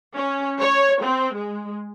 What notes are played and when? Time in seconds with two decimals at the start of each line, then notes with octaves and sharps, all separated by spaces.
0.15 C#4
0.61 C#5
1.03 C4
1.36 G#3